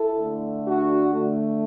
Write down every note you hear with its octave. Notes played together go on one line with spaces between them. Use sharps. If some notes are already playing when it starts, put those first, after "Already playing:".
Already playing: E4 A4
D3 A3
D4 F#4
D3 A3